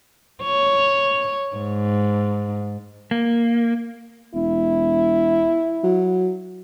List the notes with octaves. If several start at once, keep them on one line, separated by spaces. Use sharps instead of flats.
C#5
G#2
A#3
E1 E4
F#3